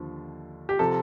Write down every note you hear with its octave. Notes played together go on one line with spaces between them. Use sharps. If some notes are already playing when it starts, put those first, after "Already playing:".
Already playing: D#2 D3 F3
G4
C3 F3 A4